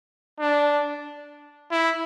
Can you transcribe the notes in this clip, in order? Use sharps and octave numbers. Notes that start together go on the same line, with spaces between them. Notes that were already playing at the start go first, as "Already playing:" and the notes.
D4
E4